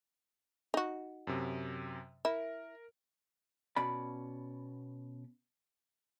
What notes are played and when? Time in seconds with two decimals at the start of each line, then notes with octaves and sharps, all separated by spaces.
0.74 D#4 F#4
1.27 F#2 C3
2.25 E4 A#4
3.76 B2 C#4 D5 B5